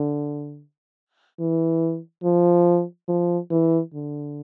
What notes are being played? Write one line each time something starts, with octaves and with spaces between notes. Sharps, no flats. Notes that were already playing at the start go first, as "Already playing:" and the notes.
Already playing: D3
E3
F3
F3
E3
D3